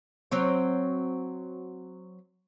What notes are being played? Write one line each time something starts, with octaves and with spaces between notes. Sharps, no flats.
F#3 C4 C#5